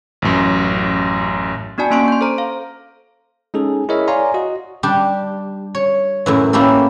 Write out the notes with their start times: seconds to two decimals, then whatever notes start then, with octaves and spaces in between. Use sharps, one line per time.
0.22 A1 F#2
1.78 B3 D4 F#4 D5 G#5 A5
1.90 A#3 C#4 C6 C#6 D7
2.08 C6 G6
2.21 A4 C5 A#5
2.38 F5
3.54 G#3 C#4 D#4 G#4 A4
3.89 E4 G#4 A#4 C#5 D#5 E5
4.08 C#5 D5 F5 G#5 A#5 C6
4.34 F#4 D#5
4.83 G3 D4 G4
5.75 C#5
6.26 F#2 A2 E3
6.53 A#3 C#4 E4 G4 A4